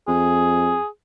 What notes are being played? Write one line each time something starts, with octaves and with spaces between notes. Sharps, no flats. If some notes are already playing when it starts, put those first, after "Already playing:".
F2 G#4